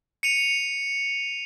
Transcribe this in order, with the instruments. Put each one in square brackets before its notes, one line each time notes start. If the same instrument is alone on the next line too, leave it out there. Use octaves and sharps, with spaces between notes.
[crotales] C#7 D#7 F7